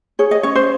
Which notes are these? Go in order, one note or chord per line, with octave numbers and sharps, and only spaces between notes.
G#4 C#5
D#5
C#4 C#5
C5